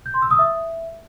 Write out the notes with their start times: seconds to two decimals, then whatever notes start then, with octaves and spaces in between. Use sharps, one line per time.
0.06 G6
0.14 C6
0.22 E6
0.31 D#6
0.39 E5